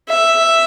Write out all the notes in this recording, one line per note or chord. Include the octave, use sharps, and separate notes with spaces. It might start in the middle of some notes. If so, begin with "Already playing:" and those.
E5